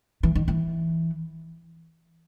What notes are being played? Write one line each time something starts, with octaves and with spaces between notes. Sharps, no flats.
E3
D#3
E3